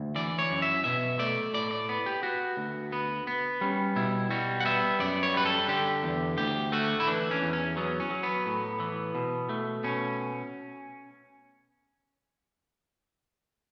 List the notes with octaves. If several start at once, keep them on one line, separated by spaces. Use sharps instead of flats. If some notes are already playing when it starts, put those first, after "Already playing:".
Already playing: D2
E3 D5
C#5
F#2
E5
B2 E5
A3 D5
A2 D5
D5
B3
G4
B3 F#4
D2
B3
B3
G3 C#4
B2 E4
G3 F#4
F#5
B3 E5
F#2 D5
C#5
G3 B4
A4
D3 G4
E2
D2 G4
A3 F#4
E4
E3 D4
C#4
E2
C#4
F#3 B3
C#4
F#3
B3
A2
E3
B2
A3
B2 C#4